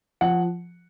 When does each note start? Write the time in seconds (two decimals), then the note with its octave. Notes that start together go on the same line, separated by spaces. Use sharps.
0.21 F3 F#5